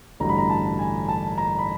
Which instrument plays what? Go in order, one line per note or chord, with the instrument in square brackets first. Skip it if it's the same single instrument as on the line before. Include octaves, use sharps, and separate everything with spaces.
[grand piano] A1 G2 D3 F#3 A#5
B5
A#5
A5
G#5
A5
A#5
B5